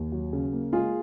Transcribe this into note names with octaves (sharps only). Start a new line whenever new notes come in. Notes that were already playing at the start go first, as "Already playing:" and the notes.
Already playing: D#2
F#3
C#3
A#3
G#3 F4 G#4